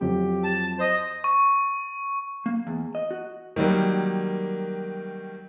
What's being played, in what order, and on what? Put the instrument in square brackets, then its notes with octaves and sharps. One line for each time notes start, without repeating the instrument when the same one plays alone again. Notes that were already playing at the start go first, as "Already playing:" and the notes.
[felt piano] F2 F3 F#3 [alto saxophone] G4
[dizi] A5
[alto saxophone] C5 [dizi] D#5
[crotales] C#6
[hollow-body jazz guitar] A#3
E2
D#5
F#4
[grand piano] D#3 F#3 G3 A#3